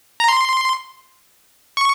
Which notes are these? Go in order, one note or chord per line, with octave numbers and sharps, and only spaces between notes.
A#5
C6
C#6